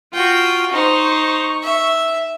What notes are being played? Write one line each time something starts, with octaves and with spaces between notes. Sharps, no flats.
F4 F#4 G5
D#4 C5 C#6
E5